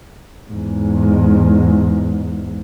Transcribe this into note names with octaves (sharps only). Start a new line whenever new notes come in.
E2 G#2